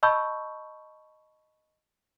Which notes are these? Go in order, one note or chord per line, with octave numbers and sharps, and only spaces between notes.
D#5 A5 B5 C#6 E6 G6